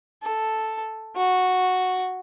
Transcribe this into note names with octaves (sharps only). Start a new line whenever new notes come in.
A4
F#4